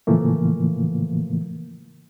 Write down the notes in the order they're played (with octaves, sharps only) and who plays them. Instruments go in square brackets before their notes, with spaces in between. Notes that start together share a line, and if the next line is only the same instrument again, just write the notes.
[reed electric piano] A2 C#3 E3 F3 A3 A#3